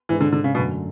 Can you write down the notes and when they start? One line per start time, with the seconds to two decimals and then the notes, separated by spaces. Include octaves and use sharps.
0.09 G#2 E3 G#3 D4
0.21 D3
0.33 D3
0.44 C#3
0.55 F#2 B2 D3 F#3 A3